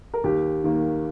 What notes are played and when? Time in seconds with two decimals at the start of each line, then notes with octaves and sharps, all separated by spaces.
0.14 A#4
0.24 D#2 G4
0.64 D#3 A#3